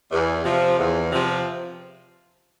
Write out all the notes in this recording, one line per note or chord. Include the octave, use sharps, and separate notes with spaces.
E2
C3 F3
E2
C3 F3